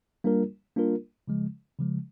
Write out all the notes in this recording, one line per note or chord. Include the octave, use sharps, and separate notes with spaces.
G3 A#3 D4 F4 A#4
G3 A#3 D4 F4 A#4
C#3 F3 G#3
C#3 F3 G#3